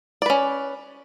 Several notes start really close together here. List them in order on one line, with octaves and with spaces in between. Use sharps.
D5 B4 C#4